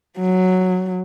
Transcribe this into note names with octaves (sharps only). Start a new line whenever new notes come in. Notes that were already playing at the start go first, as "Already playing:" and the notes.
F#3